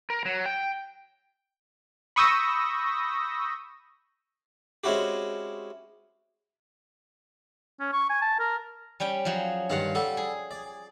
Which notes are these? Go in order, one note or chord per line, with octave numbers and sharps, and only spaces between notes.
A#4
F#3
G5
B5 C#6 D#6 E6 G6 A#6
G#3 C4 C#4 E4 F#4 G4
C#4
C#6
G#5
A5
A#4
G3 C#4 G5
F3 F#3 G#4
G2 D#3 D4 F4 F5 F#5
G3 A4 D5 F#5
G#4
D5